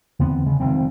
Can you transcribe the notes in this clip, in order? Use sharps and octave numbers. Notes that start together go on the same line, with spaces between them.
E2 D3 B3 C4
C#3 G#3
F1 C2 D#3 C4